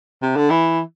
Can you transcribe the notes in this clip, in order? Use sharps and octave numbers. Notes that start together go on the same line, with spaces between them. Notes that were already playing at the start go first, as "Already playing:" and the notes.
C3
D3
E3